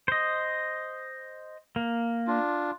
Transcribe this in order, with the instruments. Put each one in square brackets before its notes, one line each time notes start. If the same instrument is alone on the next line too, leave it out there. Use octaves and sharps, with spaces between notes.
[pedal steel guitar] C5 D#5
A#3
[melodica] D4 F4